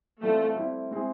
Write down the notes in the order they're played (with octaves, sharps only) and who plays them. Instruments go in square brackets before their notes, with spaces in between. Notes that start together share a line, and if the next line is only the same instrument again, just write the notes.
[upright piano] E3 G3 C4 F4 [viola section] A3
[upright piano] G3 C4 E4
G#3 C4 E4 G#4